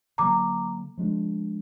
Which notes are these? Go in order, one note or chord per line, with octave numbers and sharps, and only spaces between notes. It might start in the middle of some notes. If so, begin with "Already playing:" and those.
D3 F#3 A#3 A#5 D6
F3 G#3 D4